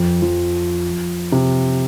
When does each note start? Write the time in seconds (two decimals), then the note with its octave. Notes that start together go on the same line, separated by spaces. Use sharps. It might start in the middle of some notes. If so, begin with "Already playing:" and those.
Already playing: F2
0.22 F3
1.32 C3